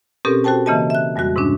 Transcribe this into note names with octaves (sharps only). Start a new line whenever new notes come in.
B2 C4 C#4 G4 A4 A#4
F#4 A4 C5 G5 A5
C#3 E3 A#3 D#5 E5 A5
E5 F#6
F2 G3 G#3 F#4 F#6
G#2 C3 G#3 C#4 D4